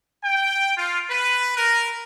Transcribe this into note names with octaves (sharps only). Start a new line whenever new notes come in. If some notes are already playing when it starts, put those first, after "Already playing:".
G5
F4
B4
A#4